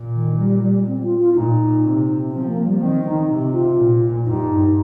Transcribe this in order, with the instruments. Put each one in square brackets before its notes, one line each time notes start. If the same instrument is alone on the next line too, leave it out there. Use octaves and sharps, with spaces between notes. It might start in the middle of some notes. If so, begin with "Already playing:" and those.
Already playing: [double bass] A#2
[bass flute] D#3
G3
G3
C4
F4
F4
[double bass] A#2 [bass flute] D#4
[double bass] C3
[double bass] F3 [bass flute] C4
[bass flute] A#3
G3
[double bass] D#3 [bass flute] C4
[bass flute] D#4
[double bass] C3
[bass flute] F4
[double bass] A#2
[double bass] G2 [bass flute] D#4